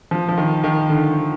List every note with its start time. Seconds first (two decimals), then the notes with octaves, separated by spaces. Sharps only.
0.11 F3
0.29 F3
0.38 D#3
0.64 D#3
0.89 D3